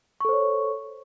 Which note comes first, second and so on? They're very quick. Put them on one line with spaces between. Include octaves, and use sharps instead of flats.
C#6 A4 C5 C#5